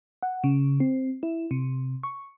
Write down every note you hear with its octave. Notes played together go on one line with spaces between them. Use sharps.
F#5
C#3
C4
E4
C3
C#6